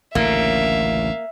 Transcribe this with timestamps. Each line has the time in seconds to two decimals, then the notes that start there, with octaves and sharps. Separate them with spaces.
0.15 A1 D2 C#3 A#3 E5 F5